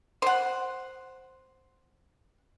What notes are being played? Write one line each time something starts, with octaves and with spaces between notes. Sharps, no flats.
C5 F#5